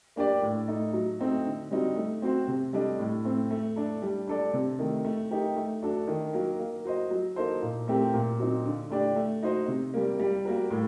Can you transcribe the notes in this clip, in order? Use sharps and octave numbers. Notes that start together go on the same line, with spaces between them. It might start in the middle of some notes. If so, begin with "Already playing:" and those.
A#3 D4 G4 D5
A2
A3 D#4
F#3
A3 C4 D#4 F#4
D3
G3 C4 D#4 F#4
A3
C4 F#4 C5
C3
G3 D4 A4 D#5
A2
A3 C4
A3
D4 A4
G3
D4 A4 D5
C3
D#3 A3
A3
D#4 G4 A#4
A3
D4 F#4 A4
D#3
F#3 A#3
A#3
F#4 C5 D#5
F#3
A#3 D#4 A4 C5
A#2
A3 C4 G4 A#4
A#2
F#3 C4 D#4
D3
A3 D4 G4 D5
A3
D#4 F#4 C5 D#5
C3
G3 A#3
G3
A#3 F#4 A#4
A2